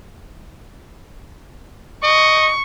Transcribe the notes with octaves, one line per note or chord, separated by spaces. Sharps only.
D#5 C#6